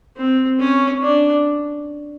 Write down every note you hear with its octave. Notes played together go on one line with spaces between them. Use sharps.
C4
C#4
D4